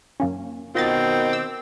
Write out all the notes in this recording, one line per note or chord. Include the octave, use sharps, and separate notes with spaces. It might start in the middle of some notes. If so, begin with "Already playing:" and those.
F#2 A#3 C#4
B2 D#3 C4 F4 D#5 A6
D6 E6